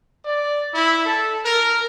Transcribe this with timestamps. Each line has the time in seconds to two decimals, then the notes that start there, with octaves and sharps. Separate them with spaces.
0.25 D5
0.74 E4
1.06 A4
1.45 A#4